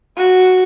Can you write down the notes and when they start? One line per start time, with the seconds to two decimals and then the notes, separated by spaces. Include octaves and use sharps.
0.18 F#4